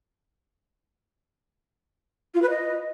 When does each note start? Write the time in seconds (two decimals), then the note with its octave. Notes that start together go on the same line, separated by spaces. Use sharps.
2.34 F4
2.42 B4
2.50 D#5